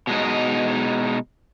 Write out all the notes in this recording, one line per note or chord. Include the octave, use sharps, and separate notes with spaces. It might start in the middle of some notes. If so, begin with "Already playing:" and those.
B2 G#3 D#4